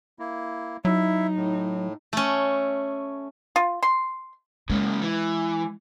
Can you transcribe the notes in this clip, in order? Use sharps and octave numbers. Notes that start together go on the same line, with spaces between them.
A#3 E4
F#3 D#4 E4 E5
A2
A3 C#4
F4
C6
C#3 G#3 A#3
E3